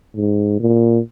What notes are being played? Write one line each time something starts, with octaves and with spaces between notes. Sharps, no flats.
G#2
A#2